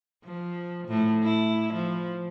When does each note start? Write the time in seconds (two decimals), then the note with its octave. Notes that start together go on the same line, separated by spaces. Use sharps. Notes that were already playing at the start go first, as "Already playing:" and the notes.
0.24 F3
0.88 A2
1.23 E4
1.73 F3